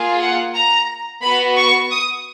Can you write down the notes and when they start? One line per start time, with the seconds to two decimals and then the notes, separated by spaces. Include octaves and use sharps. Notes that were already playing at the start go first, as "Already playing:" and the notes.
Already playing: A#3 F4 G#4
0.21 F#5
0.55 A#5
1.23 B3 F#4 B5
1.57 C#6
1.91 D#6